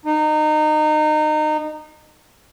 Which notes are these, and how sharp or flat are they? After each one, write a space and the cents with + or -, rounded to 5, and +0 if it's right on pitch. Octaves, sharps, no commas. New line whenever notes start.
D#4 -25